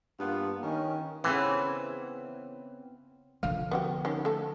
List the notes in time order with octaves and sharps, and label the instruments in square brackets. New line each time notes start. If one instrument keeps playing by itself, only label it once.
[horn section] G2 A#3 B3 F4
D#3 C#4
[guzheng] C#3 B3 C4 [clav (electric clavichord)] E3
[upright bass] D3 F3 [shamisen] F5
[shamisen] B3 F#4 G4
D#3 C#4 G4
A3 A4